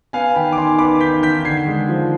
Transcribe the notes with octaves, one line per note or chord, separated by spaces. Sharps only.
B3 F5 G#5
D#3 G5 B5
D6
D#3 G#5 C6
B3 B5 D6
D#3 G6 B6
D#3 G6 B6
D3 G#6 C7
G#3
F3